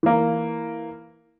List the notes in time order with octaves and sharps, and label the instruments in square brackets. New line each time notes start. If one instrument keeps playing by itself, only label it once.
[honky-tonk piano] E3 A#3